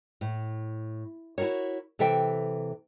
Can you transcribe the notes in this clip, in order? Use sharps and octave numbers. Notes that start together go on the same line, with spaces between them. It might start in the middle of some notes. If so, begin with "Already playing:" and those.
A2
E4 F#4 G#4 A#4 C#5
C3 E3 A4 E5 G5